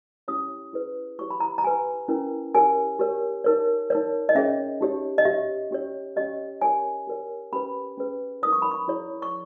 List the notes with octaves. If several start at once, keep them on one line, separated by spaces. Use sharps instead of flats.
C#4 E4 G4 C#5 D#6
E4 G#4 B4
E4 G4 C#5 C#6
B5
A#5
A#5
G4 B4 G#5
C#4 E4 A#4
G4 A#4 C#5 G#5
G4 A#4 C#5
D#4 A#4 C#5
D#4 A#4 C#5
D#5
C#4 G#4 C#5 E5
D#4 G4 C#5
D#5
G4 C#5 E5
C#4 G4 C#5
C#4 G4 C#5 D#5
G4 A#4 C#5 G#5
G4 A#4 C#5
C#4 G4 B4 B5
C#4 G#4 B4
D#4 A#4 C#5 D#6
C#6
B5
C#6
E4 G#4 C#5
C#6